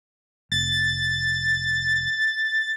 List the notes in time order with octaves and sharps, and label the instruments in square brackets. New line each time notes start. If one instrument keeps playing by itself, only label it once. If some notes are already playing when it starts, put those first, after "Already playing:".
[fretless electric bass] F1 [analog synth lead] A6